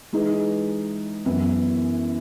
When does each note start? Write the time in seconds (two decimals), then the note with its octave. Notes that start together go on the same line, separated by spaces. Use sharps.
0.13 E3 G#3 D#4 G#4 B4
1.25 F#2 E3 B3 E4 B4